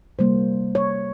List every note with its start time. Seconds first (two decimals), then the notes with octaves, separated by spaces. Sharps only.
0.19 C3 G3 A#3 C5
0.75 C#5